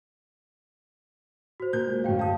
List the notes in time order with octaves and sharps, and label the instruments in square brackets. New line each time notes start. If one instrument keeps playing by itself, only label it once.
[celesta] F#4 C5
[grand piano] A#2 A#4 G6
G#3
[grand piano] D1 F#2 [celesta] F5 G5
[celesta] F5 [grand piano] A5 D#6